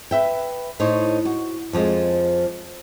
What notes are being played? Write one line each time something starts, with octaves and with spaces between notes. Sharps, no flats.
B4 E5 G5
A2 D#4 C5 C#5
F#4
F2 F3 G3 G#3